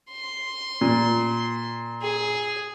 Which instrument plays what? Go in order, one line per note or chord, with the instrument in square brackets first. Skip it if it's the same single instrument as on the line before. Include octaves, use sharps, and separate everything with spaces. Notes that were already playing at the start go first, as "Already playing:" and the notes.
[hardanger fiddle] C6
[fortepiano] A#2
[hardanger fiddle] G#4